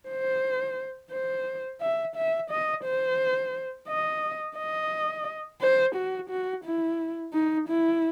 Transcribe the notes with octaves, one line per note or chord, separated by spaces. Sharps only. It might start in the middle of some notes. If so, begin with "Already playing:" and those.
C5
C5
E5
E5
D#5
C5
D#5
D#5
C5
F#4
F#4
E4
D#4
E4